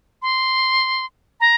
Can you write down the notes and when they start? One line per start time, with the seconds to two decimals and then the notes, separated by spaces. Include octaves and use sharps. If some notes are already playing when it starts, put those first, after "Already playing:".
0.22 C6
1.40 A#5